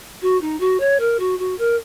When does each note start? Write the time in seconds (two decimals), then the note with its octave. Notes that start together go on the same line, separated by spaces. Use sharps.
0.22 F#4
0.41 D#4
0.60 F#4
0.80 C#5
1.00 A#4
1.19 F#4
1.39 F#4
1.58 A#4